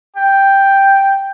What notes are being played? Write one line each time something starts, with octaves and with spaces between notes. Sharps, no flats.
G5